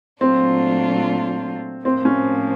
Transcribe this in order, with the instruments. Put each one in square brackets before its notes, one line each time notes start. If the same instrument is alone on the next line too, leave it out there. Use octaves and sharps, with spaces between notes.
[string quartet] A#2 F#3 A3 D4 F4 [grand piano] C4
[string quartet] A2 F3 A#3 [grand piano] C4
[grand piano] C#4